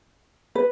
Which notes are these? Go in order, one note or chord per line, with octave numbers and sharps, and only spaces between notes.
B4